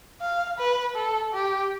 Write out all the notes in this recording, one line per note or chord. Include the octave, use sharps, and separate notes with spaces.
F5
B4
A4
G4